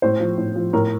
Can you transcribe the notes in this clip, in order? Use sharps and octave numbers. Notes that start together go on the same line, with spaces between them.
A2 C5
F3
A2
F3
A2 A#4